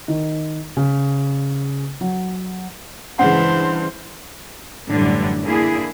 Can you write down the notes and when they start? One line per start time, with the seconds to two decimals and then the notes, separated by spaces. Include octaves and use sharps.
0.08 D#3
0.77 C#3
2.01 F#3
3.19 G2 C#3 E3 G#3 C5 F#5
4.88 F#2 A2 D3 E3 F#3 G3
5.43 D3 A#3 E4 G#4